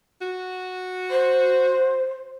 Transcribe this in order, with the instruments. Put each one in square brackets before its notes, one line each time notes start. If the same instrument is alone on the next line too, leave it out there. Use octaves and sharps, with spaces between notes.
[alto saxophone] F#4
[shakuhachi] C5